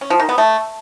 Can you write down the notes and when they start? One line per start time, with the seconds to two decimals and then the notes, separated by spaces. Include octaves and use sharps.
0.01 C#4
0.10 F3
0.20 D#3
0.29 B3
0.38 A3